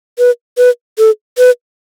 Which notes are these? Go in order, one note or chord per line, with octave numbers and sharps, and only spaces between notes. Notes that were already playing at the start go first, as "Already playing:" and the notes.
B4
B4
A4
B4